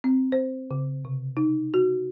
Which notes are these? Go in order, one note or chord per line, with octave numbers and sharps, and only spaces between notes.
C4
C5
C#3
C3
D#4
F#4